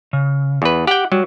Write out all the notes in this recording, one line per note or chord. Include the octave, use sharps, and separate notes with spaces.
C#3
E2 B4
G4 F#5 G5
F#3 G3